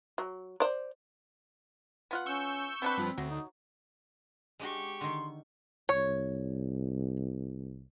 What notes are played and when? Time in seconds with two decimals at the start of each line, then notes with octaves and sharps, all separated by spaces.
0.18 F#3
0.60 C5 D5
2.11 B3 F4 F#5
2.26 C#4 C#6 E6 G6
2.82 B3 C4 D4 B4
2.98 G2 F3
3.18 D2 F#3
3.30 D#4
4.59 G#3 D4 F#4 G4 C#6
5.01 D3 D#3 C6
5.89 C2 C#5